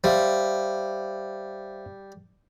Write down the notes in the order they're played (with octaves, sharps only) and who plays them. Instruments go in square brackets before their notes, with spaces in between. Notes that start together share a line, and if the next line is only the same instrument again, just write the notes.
[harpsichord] G3 [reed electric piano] C5 E5 F5